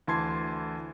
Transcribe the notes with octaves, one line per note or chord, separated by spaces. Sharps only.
D2 E3 A5 C6 G#6 C7